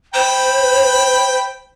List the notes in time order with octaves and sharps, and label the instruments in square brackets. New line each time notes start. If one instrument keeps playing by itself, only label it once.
[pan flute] C5 [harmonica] G5 B5